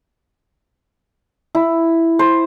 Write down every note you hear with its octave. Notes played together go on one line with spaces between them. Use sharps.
E4
C5